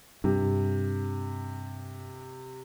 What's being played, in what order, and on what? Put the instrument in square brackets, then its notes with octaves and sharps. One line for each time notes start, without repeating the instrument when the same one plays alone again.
[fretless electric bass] G2 [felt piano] C3